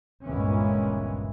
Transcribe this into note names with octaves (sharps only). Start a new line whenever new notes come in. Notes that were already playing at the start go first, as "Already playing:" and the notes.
G1 C#2 A#2 E3 G#3 C#4